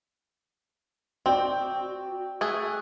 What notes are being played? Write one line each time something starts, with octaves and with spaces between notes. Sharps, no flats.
C4 F#4 D5 G5
A3 G#4 F#6